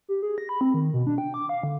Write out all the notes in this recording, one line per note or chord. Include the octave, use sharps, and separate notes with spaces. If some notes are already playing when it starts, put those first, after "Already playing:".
G4
G#4
A#6
B5
C4
D#3
B2
D4
G5
D6
F5
D3